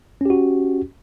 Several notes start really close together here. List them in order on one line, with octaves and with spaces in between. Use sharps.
C#4 G4 F#4